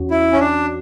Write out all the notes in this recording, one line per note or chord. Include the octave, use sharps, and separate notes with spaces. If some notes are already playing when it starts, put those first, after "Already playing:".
Already playing: E2 C#4 F#4
E4
C#4
D4